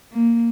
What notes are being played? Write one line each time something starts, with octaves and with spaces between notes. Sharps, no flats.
A#3